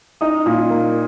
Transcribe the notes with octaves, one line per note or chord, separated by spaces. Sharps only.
D#4 D#6
A#2
A#3